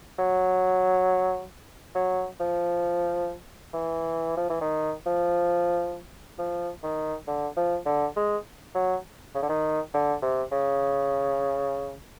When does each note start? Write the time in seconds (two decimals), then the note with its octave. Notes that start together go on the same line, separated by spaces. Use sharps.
0.19 F#3
1.95 F#3
2.40 F3
3.74 E3
4.37 F3
4.50 E3
4.61 D#3
5.06 F3
6.39 F3
6.83 D#3
7.27 D3
7.57 F3
7.86 D3
8.17 G#3
8.75 F#3
9.35 C#3
9.42 D3
9.49 D#3
9.94 D3
10.22 C3
10.52 C#3